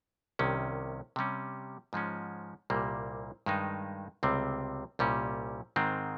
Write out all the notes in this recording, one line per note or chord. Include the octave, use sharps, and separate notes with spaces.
C2 C3 D#3 G3 C#4
C3 G3 C#4
G#2 F3 G#3 C#4
C2 A#2 G3 A#3
G2 D#3 G#3 D#4
C#2 C3 G3 C4
C2 A#2 G3 C#4
G#2 D#3 G#3 C4